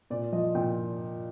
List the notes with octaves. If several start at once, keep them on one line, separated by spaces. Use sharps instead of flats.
A#2 D5
F3 D#5
A#2 G5